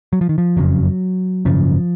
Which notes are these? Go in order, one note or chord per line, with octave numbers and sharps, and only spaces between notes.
F#3
F3
D#3
F3
F#1 F2 C#3 F#3
G#1 F#2 C#3 F3